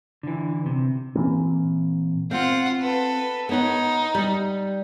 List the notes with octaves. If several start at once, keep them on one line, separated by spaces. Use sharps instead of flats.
D3 E3
C3
A#2 E3 A#3 C4
C4 F4 F#5
A4 B4
B3 D#4 C#5 F#5
G3